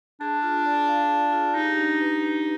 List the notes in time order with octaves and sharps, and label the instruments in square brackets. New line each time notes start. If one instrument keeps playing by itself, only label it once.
[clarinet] D4 [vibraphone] G#4
[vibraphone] F4
D5
F5
G#4
F4
[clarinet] D#4 [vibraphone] G4
[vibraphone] D4
B4
D4